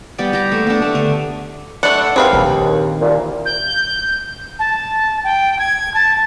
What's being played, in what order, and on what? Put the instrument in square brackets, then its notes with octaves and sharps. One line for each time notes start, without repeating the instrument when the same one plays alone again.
[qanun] G3 B3 D5 G5
G4 A#5
A3 A#3
B3 D4
A3 E5
D3
[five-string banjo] A3 D4 [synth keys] F#5
[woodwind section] D#2 [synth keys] C4 [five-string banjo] G#4 B4 F5
[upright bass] A#1 D#3
[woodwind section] C2 A#2
[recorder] G6
A5
G5
G#6
A5